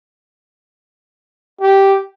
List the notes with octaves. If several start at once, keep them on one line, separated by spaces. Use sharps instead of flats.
G4